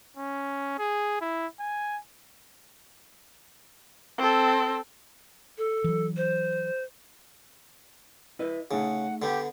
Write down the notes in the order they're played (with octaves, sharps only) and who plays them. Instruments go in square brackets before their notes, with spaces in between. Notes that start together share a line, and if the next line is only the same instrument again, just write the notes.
[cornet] C#4
G#4
E4
G#5
[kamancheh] C4 A4
[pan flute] A4
[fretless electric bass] E3 F#3
[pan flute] C5
[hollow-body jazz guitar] E4 B4 D#5
[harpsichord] C#3 [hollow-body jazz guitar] A3 D#4 G#4 [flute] F#5
[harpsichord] D3 B3 [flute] G4